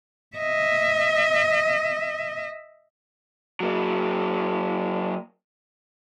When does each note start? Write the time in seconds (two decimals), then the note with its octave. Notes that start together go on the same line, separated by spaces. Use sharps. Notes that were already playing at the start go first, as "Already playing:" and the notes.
0.36 D#5 E5
3.60 F#3 A#3